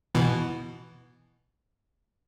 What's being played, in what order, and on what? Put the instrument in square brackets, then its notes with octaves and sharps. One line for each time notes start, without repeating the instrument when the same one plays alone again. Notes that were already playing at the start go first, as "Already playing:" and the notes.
[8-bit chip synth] B2 E3